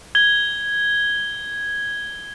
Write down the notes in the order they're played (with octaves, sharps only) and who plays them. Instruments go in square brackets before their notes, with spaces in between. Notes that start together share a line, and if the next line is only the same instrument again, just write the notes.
[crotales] G#6 G7